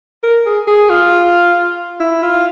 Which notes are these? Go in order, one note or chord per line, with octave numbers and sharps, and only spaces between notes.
A#4
G#4
G#4
F4
E4
F4